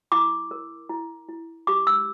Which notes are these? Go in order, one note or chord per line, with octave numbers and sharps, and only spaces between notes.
E4 D6
A#4
E4
E4
G4 D6
E6